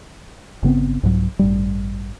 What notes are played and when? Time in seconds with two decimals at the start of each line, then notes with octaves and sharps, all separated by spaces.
0.63 G1 C#3 B3 C4
1.03 C2 G#2 F#3
1.39 A1 G2 G3